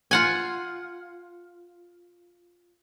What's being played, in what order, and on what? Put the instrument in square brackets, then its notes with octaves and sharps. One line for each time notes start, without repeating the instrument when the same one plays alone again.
[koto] F4 F#5 G#5